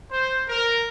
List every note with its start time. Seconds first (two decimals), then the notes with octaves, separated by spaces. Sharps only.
0.11 C5
0.48 A#4